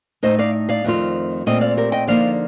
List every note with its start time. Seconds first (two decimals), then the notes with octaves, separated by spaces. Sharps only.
0.23 A2 A3 D#4 C5 D#5
0.39 D5 F5
0.69 D5 F5
0.84 F2 D#3 A3 C4 F4
1.46 A#2 A3 C4 F4 D#5 G5
1.61 D5 F5
1.77 G4 A#4
1.92 D#5 G5
2.07 D3 F3 A#3 D#4 D5 F5